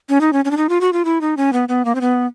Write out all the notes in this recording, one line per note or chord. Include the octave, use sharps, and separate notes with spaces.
C#4
D#4
C#4
C#4
D4
D#4
F4
F#4
F4
E4
D#4
C#4
B3
B3
A#3
C4
B3